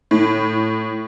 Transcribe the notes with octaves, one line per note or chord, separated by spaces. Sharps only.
A2